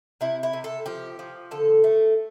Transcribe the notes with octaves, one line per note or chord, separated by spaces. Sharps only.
C3 E4
E4
C3
A4
F3 G4
F3
D3 A4
A3